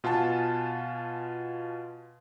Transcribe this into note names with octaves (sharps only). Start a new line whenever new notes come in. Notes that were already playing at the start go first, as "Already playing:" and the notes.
B2 F4 F#5 G#5 A5